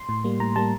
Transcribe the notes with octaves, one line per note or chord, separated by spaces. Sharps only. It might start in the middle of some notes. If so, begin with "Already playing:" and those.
Already playing: C6
A2
G3 A#3
A2 A#5
G3 A#3 A5